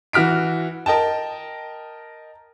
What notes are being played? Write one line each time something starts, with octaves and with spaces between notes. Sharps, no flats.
E3 F#4 F6 B6 D7
A#4 D#5 G5 A5